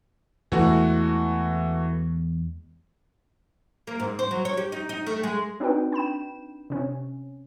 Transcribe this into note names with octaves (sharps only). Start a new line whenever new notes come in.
E2 E3 G#3 A3 F#4
A#3
G#2
C5
F#3
C#5
G4
D#4
D#4
A3
G#3
C4 D4 D#4 F#4 B4 G5
G5 B5 E7
C3 C#4